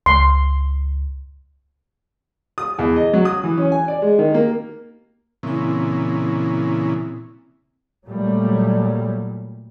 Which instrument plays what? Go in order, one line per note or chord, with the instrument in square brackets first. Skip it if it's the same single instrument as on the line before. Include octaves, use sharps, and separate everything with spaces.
[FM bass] C#2 [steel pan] C6
[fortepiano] D#6
E2
D#5
F#3
D#6
E3
C#4
G#5
D5
G#3
D#3
A#3
[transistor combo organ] A#2 C#3 E3 [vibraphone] C4 E4
[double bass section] A#2 F#3 G3 A3